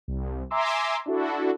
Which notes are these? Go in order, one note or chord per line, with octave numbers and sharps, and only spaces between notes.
C2
E5 G#5 A#5 C6 D6 E6
D4 E4 F#4 A4